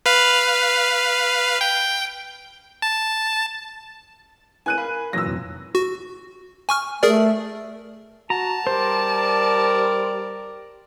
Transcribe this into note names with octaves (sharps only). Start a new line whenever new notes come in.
B4 F5
G5
A5
E4 B4 G#5 F#6 D#7
A#4 F5 B5
A#2 E3 F#3 E6 A#6
F1
F#4
G#5 C#6 F6
A3 G#4 A#4 D5
F#4 A5 A#5
G3 A#4 C5 D5